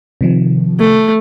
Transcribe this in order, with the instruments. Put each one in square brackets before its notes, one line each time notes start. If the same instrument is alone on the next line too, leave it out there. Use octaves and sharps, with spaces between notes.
[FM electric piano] C3 D#3 F3
[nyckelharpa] A3